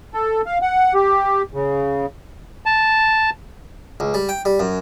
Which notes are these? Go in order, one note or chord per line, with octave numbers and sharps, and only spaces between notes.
A4
F5
F#5
G4
C#3
A5
C#2
G3
G5
G3
F#2